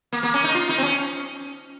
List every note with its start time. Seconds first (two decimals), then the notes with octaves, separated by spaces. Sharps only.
0.13 A#3
0.23 A#3
0.34 C#4
0.44 D#4
0.55 F4
0.69 D#4
0.78 C4
0.83 C#4